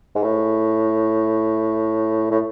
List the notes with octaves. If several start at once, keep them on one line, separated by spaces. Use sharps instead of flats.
G#2
A2
A2